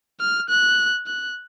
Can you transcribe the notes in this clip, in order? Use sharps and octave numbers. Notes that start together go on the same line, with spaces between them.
F6
F#6
F#6